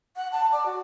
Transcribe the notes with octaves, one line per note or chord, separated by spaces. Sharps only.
F#5
A5
D5
F#4